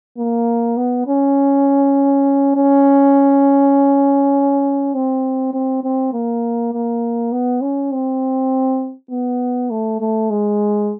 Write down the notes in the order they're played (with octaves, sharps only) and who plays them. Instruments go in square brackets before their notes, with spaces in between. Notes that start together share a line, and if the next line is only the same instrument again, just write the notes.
[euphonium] A#3
B3
C#4
C#4
C4
C4
C4
A#3
A#3
B3
C#4
C4
B3
A3
A3
G#3